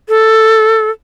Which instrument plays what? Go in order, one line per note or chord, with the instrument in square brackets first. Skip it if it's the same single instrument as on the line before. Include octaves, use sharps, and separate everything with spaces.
[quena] A4